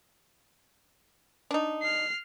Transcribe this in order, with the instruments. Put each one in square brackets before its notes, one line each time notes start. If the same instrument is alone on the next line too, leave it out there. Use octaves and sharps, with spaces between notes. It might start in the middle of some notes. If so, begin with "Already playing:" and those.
[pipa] D4 D#4
[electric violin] F6 C7